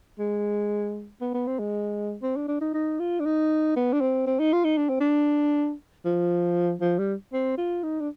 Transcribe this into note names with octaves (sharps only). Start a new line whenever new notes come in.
G#3
B3
B3
C4
G#3
C4
D4
D4
D#4
D#4
F4
D4
D#4
B3
D4
C4
C4
D#4
F4
D#4
D4
C4
D4
F3
F3
G3
C4
F4
D#4
D4